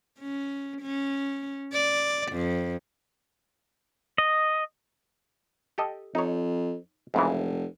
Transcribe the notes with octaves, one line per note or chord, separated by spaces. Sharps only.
C#4
C#4
D5
F2
D#5
G4 A4 D#5
F2 D#4 C#5
F1 G#2 C#3 E3